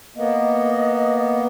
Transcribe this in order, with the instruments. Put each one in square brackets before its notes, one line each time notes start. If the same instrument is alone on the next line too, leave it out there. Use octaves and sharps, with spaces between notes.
[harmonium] A#3 B3 [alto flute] D#5